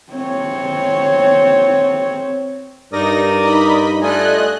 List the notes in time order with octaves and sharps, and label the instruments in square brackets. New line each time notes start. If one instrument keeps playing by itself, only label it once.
[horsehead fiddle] C4 C#5
[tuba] G2 [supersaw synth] D#4 A#6 [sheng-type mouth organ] A#4 D5 D#6
[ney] D#4 [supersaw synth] D#5 B5
[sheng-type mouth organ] A3 F4 G#5 [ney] D5 [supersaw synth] D#5 F#6